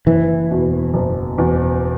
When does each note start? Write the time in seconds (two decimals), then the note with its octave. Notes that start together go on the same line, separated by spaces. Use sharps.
0.06 F#1 E3
0.51 E2 B2
0.94 F#1
1.38 E2 B2